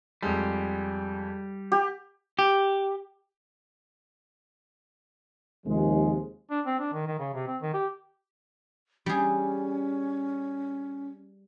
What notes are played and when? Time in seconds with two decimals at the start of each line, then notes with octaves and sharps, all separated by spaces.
0.23 F2 G3 G#3
1.72 G4
2.39 G4
5.66 D#2 C3 F3 G#3
6.50 D4
6.66 C4
6.79 D4
6.93 D#3
7.06 D#3
7.19 C#3
7.34 C3
7.47 C4
7.62 D#3
7.74 G4
9.06 G3 C#4 G#4